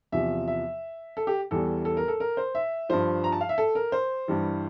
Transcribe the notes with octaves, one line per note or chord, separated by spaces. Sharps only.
E2 C3 F3 E5
E5
A4
G4
E2 E3 G3 A4
A4
A#4
A4
A#4
C5
E5
G2 F3 C5
A#5
A5
F5
E5
A4
A#4
C5
G2 E3 G3